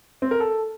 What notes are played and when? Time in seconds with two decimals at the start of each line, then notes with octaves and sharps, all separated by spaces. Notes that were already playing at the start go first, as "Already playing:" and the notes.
0.22 C4
0.31 A#4
0.40 A4